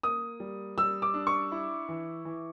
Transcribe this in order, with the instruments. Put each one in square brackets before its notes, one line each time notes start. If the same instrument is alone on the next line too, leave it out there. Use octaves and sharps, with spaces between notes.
[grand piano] A#3 [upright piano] D#6
[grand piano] G3
[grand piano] G3 [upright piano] E6
[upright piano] D6
[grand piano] D4
[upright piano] C#6
[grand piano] E4
E3
E3